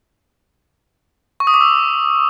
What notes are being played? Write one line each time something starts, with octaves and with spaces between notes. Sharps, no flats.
C#6
D#6
D6
E6